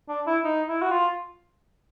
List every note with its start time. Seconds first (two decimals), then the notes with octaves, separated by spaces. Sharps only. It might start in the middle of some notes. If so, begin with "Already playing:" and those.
0.08 D4
0.27 E4
0.44 D#4
0.67 E4
0.82 F#4
0.91 F4